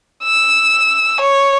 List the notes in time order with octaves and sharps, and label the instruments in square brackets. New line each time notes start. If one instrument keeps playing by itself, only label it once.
[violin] E6
C#5